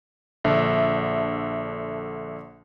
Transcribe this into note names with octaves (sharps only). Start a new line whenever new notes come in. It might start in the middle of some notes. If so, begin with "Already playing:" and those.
A#1 D3 A4 E5